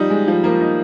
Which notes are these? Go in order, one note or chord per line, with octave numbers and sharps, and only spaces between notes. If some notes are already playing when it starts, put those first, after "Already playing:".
Already playing: F3 G3 D#4
G#3
F3
F3 A#3
D#4